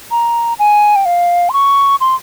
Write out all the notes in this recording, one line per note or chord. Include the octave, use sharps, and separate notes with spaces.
A#5
G#5
G5
F5
C6
C#6
C6